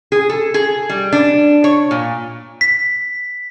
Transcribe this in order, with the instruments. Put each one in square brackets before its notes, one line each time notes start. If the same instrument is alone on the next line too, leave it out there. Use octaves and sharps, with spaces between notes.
[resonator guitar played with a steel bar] G#4
A4
G#4
G3
D4
C#5
A#2
[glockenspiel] B6